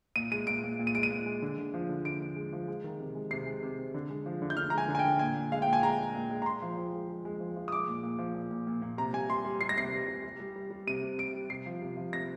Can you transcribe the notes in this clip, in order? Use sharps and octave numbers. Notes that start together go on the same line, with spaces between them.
A#2 D#7
G#3 D#7
A#2 D7
A#2
A#2
D#7
G#3 D7
D#7
A#2
G#3
D3
D3
F3
D3
D3 D7
D3
G#3
F3
G#3
D#3
C3
G#3
C3 C7
G#3
C3
C3
D3
G#3
F3
D3
G6
D3 F6
G#3 A#5
G#5
D3
G#5
G5
D3
A#2 G#5
A#2
G#3 F5
A#2 G5
G#5
G#3 A#5
G#3
A#2
G#3
A#5
A#2 C6
F3
F3
G#3
G#3
G#3
F3
F3
D#6
G#3 D6
A#2
A#2
F3
A#2
A#2
A#2
A#2
C3 A#5
G3 G#5
G3 C6
G3
G3 C7
A#6
C3 C7
G3
G3
G3
G3
G3
G3
C3 D#7
C3
G3 D7
G3
C3 C7
F3
C3
F3
C3 A#6